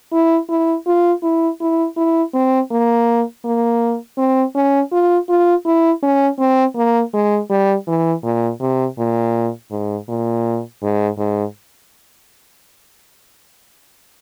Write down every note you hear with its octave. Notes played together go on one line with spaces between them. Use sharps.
E4
E4
F4
E4
E4
E4
C4
A#3
A#3
C4
C#4
F4
F4
E4
C#4
C4
A#3
G#3
G3
E3
A#2
C3
A#2
G#2
A#2
G#2
G#2